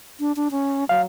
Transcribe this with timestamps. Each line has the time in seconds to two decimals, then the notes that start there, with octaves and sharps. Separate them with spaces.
0.20 D4
0.36 D4
0.51 C#4
0.89 F#3 F5